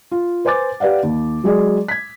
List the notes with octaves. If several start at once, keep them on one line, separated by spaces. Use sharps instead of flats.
F4
B4 C5 G#5 D6 A6
G4 B4 D5 F5 F#5
D#2
F#3 G#3 G#4 D5
G#6 B6